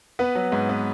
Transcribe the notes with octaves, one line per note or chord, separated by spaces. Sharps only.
B3 B4
F#3
G#2
B3